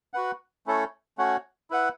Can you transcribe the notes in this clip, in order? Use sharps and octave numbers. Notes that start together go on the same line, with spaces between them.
F#4 B4 F#5
A3 C#4 E4 A4 C#5
A3 C#4 F#4 C#5 F#5
E4 B4 F#5